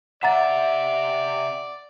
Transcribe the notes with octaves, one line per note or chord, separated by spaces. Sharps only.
C3 D5 E5 F#5 A#5 A6